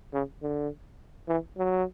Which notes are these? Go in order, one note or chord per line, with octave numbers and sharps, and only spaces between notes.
C#3
D3
E3
F#3